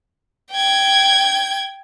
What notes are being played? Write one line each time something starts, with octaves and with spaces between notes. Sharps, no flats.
G5 G#6